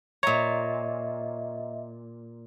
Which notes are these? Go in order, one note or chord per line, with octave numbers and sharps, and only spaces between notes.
A#2 C#5 D#5 E5 A#5